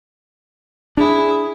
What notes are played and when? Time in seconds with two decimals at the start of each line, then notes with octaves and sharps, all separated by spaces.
0.97 D4 E4 G#4